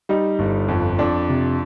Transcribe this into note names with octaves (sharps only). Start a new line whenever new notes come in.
G3 D#4
G1
F2
F2 D4
C3